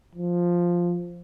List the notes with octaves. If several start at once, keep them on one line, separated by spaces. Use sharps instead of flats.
F3